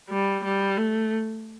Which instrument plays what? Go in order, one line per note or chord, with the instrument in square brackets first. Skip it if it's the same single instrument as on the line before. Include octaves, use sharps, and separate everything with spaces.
[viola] G3
G3
A3